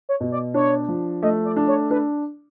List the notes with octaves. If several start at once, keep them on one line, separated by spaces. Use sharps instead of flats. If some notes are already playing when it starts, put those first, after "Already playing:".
C#5
B2
D5
D4 C#5
F3
A3 D#5
D5
D4
C#5
D4 B4